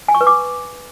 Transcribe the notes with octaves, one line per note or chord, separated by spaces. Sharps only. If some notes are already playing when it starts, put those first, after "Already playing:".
G#5
C#6
B4
D6